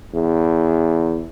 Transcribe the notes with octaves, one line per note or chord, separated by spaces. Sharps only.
E2